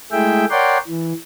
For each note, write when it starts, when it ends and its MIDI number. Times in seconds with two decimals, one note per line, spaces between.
0.12 0.45 56
0.12 0.45 57
0.12 0.45 64
0.12 0.45 68
0.12 0.45 76
0.12 0.45 79
0.51 0.78 70
0.51 0.78 73
0.51 0.78 74
0.51 0.78 78
0.51 0.78 79
0.51 0.78 84
0.87 1.13 52